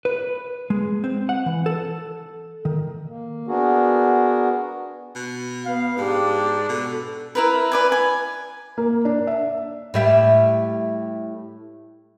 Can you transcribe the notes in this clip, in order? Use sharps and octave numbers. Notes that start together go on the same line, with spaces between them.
B4
G#3
C4
F#5
E3
A4
D#3
A#3
B3 D4 F#4 G#4 A#4
B2
B3 F5
G#2 D4 G4
B2 A4
E4 A#4 B4
B4 D5 G#5
G#5
A#3
D4
E5
A2 G3 E5